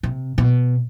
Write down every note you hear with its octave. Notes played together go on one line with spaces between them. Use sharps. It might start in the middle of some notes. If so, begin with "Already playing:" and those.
C3
B2